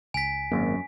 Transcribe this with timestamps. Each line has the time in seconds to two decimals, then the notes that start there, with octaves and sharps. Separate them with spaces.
0.14 C#2 G#5 B6
0.52 G#1 F#2 A#3